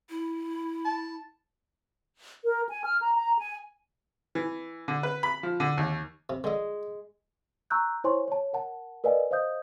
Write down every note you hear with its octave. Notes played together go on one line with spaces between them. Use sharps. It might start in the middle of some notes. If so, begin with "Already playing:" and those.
E4
A5
A#4
G#5
F6
A#5
A#5
G#5
E3
D3
B4
B5
F3
D3
D#2
C3
D3 G#3 D#5
A#5 C#6 E6 F#6 G6
E4 C5 C#5 G#5 C6 C#6
C#5 A5
A#4 F#5 A5
A#4 B4 D5 D#5 F5 G#5
C5 D#5 F5 D#6 G6